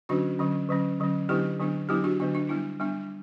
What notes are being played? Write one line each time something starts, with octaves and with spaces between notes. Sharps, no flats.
D3 F#3 C#4 D4 F#4
D3 F#3 C#4
D3 F#3 C#4
D3 F#3 C#4
D3 F#3 B3 D4 E4 G4
D3 F#3 B3 D4
D3 F#3 B3 D4 E4 G4
D4 F#4
D3 F#3 B3 D4
D4
G3 B3 D4 E4
G3 B3 D4